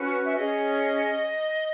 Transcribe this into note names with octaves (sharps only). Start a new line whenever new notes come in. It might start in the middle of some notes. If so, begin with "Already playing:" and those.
Already playing: C#4 F#4 B4
E5
C#4 G#4 C#5 D#5